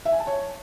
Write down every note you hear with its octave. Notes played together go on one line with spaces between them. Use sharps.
E5
G#5
A5
C#5